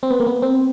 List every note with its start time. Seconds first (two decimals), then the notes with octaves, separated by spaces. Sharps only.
0.03 C4
0.10 B3
0.20 A#3
0.27 B3
0.42 C4